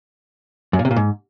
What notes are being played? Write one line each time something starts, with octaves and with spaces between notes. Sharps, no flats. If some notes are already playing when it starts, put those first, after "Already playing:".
F#2
A#2
C3
A#2
G#2